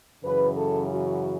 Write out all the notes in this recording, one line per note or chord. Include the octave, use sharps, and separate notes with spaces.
F#2 C#3 E3 B4
A4
F#4